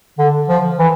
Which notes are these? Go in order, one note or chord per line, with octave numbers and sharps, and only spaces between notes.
D3
F3
E3